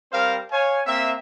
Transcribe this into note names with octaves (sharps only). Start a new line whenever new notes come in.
G3 C4 A#4 C5 F5
C#5 F5 G#5
A#3 C4 E5